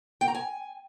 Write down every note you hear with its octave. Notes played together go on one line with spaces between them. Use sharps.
G5
A#5
G#5